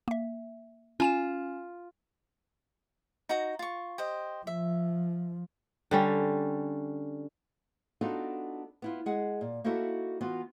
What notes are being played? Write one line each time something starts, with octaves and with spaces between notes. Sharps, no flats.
A#3 E5
C#4 F4 G#5 E7
D#4 F#4 A#5
F4 C#6
G4 C5 D#5
F3 E5
D3 G3 C#4
B3 D4 D#4 F4 F#4 A4
B3 E4 F4
G#3 G#4 F#5
A#2
A#3 D#4 E4 F#4 A4 E5
E3 B3 F4 F#4